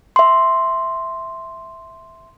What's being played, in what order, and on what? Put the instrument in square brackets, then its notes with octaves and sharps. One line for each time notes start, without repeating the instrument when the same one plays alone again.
[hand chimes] E5 C6